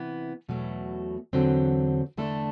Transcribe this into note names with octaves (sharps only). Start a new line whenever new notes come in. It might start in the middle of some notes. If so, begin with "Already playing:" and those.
Already playing: C3 E3 B3
E2 B2 F#3 A3
E2 D3 F#3 C4
E2 D3 A3 D4 A4